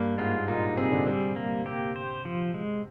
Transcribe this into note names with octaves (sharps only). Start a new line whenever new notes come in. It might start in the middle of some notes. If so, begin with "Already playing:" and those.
Already playing: G2 G3 A#3
G#2 G#3 F4
A#2 A#3 D#4
C3 C4 G#4
D3 D4
C3 G3 C4
A#3
C3 C4 G4
C5
F3
G#3